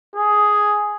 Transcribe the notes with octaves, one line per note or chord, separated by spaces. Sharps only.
G#4